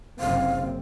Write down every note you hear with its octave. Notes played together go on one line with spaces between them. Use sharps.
F#1 C3 C4 F5